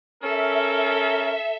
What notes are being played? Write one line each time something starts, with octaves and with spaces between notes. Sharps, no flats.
C#4 A4 A#4 E5